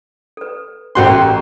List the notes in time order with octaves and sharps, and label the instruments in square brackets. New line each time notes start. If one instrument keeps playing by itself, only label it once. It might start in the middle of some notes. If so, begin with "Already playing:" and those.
[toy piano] A4 B4
[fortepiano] A1 F#4 C6 [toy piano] C#4 G5
[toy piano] G4 A#4 A#5